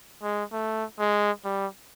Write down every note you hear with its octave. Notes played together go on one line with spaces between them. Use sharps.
G#3
A3
G#3
G3